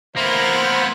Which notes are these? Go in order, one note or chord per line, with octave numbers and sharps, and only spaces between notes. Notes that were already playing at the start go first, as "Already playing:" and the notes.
E3 A#3 B3 E4 A#4 C5